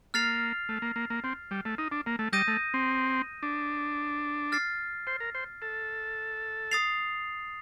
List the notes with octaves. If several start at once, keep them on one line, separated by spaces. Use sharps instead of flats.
A#3 F6 A6 C7 F7
A3
A#3
A#3
A#3
C4
G3
A3
D#4
D4
A#3
A3
G3 D#6 G6 A#6 D#7
A3
C4
D4
F6 A6 C7
C5
A#4
C5
A4
D#6 A6 C7 F7